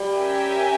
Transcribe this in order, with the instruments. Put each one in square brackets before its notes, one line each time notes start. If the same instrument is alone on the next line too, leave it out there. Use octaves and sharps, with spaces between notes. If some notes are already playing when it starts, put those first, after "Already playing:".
Already playing: [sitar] G3
[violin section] C#4 G4 A#4 E5 G#5